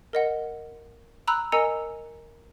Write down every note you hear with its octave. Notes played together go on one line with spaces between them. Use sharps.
A#4 D#5 F#5
A#5 B5 E6 F#6
A#4 D#5 G#5 A#5 E6 C#7